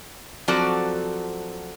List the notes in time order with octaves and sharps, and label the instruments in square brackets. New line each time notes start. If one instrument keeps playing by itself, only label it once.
[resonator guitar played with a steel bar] F3 F#3 C4 F#4 A4 D5